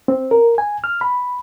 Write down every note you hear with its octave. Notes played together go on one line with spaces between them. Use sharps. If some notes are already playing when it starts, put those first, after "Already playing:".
C4
A#4
G#5
F6
B5